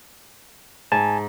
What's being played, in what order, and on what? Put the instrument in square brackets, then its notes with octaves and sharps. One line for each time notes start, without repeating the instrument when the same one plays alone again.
[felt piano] G#2 [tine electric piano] G#5 A5